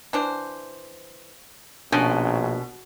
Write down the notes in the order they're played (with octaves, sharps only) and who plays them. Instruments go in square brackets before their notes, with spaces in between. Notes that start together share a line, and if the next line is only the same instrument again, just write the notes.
[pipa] E3 D4 C5
[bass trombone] A#1 [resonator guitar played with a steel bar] B2 [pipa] C#4 [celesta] D4 A5